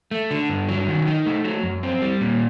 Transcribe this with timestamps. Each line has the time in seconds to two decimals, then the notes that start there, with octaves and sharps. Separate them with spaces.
0.11 A3
0.31 D3
0.49 G2
0.69 F#3
0.88 D#3
1.07 D#4
1.26 A3
1.44 F#3
1.63 F#2
1.83 C4
2.02 G3
2.21 A#2